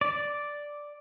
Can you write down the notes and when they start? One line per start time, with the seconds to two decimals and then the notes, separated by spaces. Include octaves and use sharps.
0.01 D5